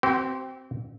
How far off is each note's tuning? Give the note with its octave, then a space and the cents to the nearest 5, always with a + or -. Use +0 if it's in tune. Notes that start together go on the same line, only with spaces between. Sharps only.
C4 +0 G4 -45